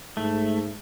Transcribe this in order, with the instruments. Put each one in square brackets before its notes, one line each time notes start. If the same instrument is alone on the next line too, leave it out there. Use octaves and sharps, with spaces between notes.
[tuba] G#2 [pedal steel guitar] A3